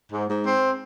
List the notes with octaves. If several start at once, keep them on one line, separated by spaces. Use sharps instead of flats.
G#2
G#2
C4